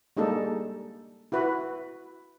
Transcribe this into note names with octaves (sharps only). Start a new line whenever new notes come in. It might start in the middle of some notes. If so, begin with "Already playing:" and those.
G3 G#3 A#3 D4 D#4 A4
E4 F#4 B4